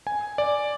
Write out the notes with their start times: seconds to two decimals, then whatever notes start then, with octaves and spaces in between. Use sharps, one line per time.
0.07 G#5
0.38 D5